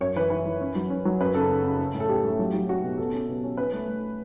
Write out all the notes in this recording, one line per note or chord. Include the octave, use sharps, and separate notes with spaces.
F#2 C#5
E3 B4
E3 B4
E3
C#4
F#3
C#4
F#3
F#2 B4
C#3 A4
C#3
C#3
C#4
A2
A4
C#4 G4
A3
F#3
F#3
C#4 F#4
B2
B2 A4
C#4
B2
C#4
C#4 B4
A3
A3